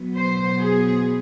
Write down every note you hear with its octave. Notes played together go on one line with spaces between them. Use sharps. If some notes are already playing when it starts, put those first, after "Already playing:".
Already playing: B2 F#3 B3
C5
G#4